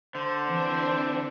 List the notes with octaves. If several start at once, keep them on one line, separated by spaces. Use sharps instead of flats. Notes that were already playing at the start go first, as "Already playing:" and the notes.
D3 C5
E3 C4 D4